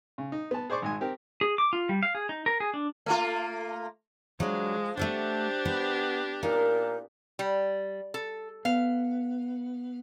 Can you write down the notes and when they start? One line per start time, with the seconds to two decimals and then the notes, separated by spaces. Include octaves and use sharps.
0.18 C#3
0.32 D#4
0.51 B3 A5
0.70 G#4 C5 D5 C#6 D6
0.82 G#1 G#3 G#5
1.01 C4 G4 A#4
1.41 G#4
1.58 D6
1.73 F4
1.89 G3
2.03 F5
2.15 G#4
2.29 D#4
2.46 A#4
2.60 G#4
2.74 D4
3.06 A3 A#3 F4
4.40 F3 F#3 G#3 D4
4.97 A3 D4 G4 A4 C5 F#5
5.65 B3
6.43 A#2 D#4 A#4
7.39 G3
8.14 A4
8.65 B3 F5